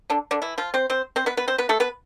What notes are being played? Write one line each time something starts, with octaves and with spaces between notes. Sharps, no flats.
D3 D4
D3 D4
E3 E4
F3 F4
C4 C5
C4 C5
C4 C5
B3 B4
B3 B4
C4 C5
B3 B4
A3 A4
B3 B4